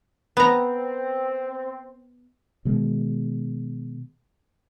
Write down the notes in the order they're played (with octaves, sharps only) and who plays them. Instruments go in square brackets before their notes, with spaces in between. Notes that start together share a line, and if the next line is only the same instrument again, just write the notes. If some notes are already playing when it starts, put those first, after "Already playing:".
[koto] B3 A#5 [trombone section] C4
[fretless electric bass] B2 D#3 G#3